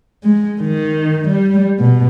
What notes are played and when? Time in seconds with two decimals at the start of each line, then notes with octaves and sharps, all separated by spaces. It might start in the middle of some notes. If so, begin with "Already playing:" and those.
0.24 G#3
0.61 D#3
1.27 G3
1.79 B2